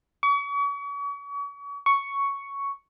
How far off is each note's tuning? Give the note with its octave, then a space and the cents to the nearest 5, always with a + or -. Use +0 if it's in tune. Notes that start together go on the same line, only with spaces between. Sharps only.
C#6 +40
C#6 +5